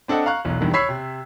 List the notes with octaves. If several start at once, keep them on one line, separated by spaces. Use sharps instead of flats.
C4 D4 A4 D#5 F#5
F5 A#5 C#6 F#6
E1 B1 E2
E2 G2 C3 D#3
C#5 B5 E6 G#6 B6 C7
C3